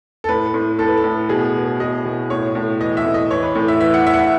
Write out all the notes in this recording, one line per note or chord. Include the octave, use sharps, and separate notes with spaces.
A4
A2 B4
A2
A2 A4
B4
A4
A2
B2 G#4
B2
B2 D#5
B2
A2 C#5
A2
E3 D#5
E5
A2
D#5
E3 C#5
B4
A2
E5
E3 E5
F#5
E3 E5
F#5
E5